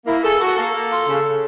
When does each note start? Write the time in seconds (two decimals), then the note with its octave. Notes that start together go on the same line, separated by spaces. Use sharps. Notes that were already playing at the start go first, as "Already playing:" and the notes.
0.06 A#3 E4
0.23 G#4 A4
0.40 F#4 A4
0.57 A#3 A4
0.74 A#3
0.90 F4
1.08 C#3
1.25 C#3